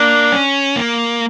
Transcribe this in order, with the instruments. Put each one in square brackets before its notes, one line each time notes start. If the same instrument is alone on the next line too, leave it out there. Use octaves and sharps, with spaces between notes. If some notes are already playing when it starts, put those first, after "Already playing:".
Already playing: [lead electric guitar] A#3 [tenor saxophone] D4
[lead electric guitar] C#4
A#3